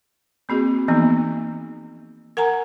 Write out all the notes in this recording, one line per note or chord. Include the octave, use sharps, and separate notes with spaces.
A#3 C4 F#4 G#4
E3 F3 A#3 B3 D#4
A#4 F#5 G#5 A#5